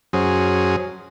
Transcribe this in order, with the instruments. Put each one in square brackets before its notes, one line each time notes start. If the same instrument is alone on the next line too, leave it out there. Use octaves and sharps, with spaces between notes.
[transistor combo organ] F#2 F#3 C#4 G#4 C5 D#6